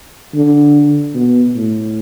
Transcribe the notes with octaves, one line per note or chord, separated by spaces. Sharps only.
D3
B2
A2